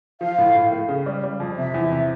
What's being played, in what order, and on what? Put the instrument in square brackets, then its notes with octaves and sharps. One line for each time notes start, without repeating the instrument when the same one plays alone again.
[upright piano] F3 [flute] F5
[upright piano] A2
A2
A3
C#3
G3
G3
F2
[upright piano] C3 [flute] E5
[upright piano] E2
C3